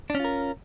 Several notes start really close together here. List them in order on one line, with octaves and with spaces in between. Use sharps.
D4 C#4 F4 A#4